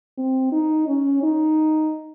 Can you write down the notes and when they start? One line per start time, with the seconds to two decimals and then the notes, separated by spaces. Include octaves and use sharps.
0.18 C4
0.52 D#4
0.88 C#4
1.23 D#4